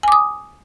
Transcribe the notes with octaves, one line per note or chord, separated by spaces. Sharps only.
G#5 D6 D#6